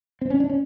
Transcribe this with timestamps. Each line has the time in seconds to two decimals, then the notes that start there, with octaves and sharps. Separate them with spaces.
0.21 C4
0.30 C#4
0.40 D4
0.50 C#4